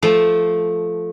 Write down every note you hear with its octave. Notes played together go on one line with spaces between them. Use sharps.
F3 A3